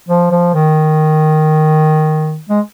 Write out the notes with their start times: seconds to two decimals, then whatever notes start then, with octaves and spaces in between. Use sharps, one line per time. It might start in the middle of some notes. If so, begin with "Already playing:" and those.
0.09 F3
0.32 F3
0.54 D#3
2.49 G#3